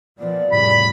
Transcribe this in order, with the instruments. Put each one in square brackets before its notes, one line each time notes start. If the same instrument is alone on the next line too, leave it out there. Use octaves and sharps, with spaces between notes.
[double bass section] A#2 F3 B3 [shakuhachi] D5
[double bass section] F1 C#3 G3 [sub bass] A2 [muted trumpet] B5